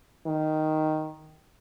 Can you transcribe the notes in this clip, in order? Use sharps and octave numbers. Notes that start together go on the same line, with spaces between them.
D#3